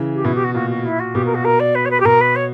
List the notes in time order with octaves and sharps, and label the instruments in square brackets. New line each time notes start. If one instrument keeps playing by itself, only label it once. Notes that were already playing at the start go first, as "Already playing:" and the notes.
Already playing: [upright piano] C#3 E3
[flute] G4
[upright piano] B2 [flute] E4
[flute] G4
F#4
[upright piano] A#2 [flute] F#4
[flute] F#4
E4
F#4
[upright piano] B2 [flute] G4
[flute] A#4
F#4
A#4
D5
B4
C#5
B4
G4
[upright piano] B2 [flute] A#4
[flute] B4
C#5